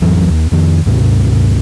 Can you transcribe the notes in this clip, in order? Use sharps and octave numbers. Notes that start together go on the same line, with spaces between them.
A1 F2 E3 F#3
D#2
F2 D#3
C#2 G2 B2